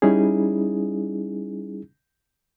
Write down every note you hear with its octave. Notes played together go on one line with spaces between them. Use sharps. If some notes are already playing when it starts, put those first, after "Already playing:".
G3 C#4 D#4 E4 G#4